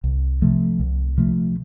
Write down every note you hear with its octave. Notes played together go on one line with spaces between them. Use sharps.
C2
C3 F3 A3
C2
C3 F3 A3